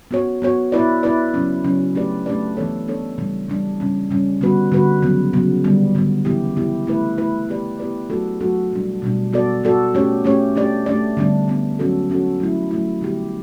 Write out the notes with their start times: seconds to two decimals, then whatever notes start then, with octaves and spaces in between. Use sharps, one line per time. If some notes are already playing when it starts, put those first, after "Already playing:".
0.11 B3 F#4 C#5
0.42 B3 F#4 C#5
0.72 B3 E4 B4 D5
1.03 B3 E4 B4 D5
1.34 C#3 F#3 C#4
1.64 C#3 F#3 C#4
1.95 A3 D4 G4 B4 D5
2.26 A3 D4 G4 B4 D5
2.57 E3 B3 D4 A4 C#5
2.88 E3 B3 D4 A4 C#5
3.18 C#3 E3 G3 D4
3.48 C#3 E3 G3 D4
3.80 C#3 G3 C#4
4.11 C#3 G3 C#4
4.41 D3 G3 B3 F#4 B4
4.72 D3 G3 B3 F#4 B4
5.02 C#3 F#3 B3
5.33 C#3 F#3 B3
5.64 D3 G3 B3
5.95 D3 G3 B3
6.25 C#3 E3 B3 E4 G4
6.56 C#3 E3 B3 E4 G4
6.87 A3 E4 B4
7.18 A3 E4 B4
7.49 B3 E4 G4 B4 D5
7.79 B3 E4 G4 B4 D5
8.10 F#3 A3 D4 F#4 A4
8.40 F#3 A3 D4 F#4 A4
8.72 B2 G3 D4
9.02 B2 G3 D4
9.33 B3 F#4 A4 D5
9.64 B3 F#4 A4 D5
9.94 A3 C#4 G4 C#5
10.25 A3 C#4 G4 C#5
10.56 A3 D4 G4 D5
10.86 A3 D4 G4 D5
11.17 D3 G3 B3 D4
11.48 D3 G3 B3 D4
11.79 F#3 C#4 F#4 A4
12.10 F#3 C#4 F#4 A4
12.40 F#3 A3 E4
12.71 F#3 A3 E4
13.01 D3 G3 B3 E4 G4